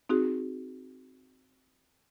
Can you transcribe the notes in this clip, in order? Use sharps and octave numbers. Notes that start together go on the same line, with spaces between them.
C4 D#4 F#4 G#4